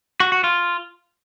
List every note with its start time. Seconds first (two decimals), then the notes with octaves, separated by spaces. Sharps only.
0.20 F#4
0.32 F#4
0.44 F4